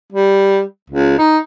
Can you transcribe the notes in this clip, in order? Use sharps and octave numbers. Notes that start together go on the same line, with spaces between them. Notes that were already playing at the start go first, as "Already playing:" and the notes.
G3
C#2
D#4